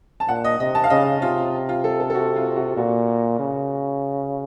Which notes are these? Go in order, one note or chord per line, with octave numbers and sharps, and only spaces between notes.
A5
A#2 F#5
D#5
C3 D#5
A5
F5
C#3 D#5
C3 F4
F4
A4
A4
A4
F#4
F4
F#4
A#2 F#4
C#3